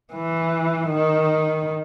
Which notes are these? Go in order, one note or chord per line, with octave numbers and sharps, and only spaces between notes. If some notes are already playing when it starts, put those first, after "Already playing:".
E3
D#3